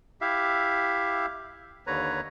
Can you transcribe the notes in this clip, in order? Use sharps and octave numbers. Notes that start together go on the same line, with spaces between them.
E4 G4 E5 F5
D#2 D3 B4 C#5 A#5